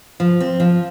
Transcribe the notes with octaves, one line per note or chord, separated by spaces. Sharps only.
F3
C4
F3